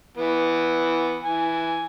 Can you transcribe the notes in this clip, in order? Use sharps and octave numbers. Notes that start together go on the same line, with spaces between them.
E3 B3
E3 G#5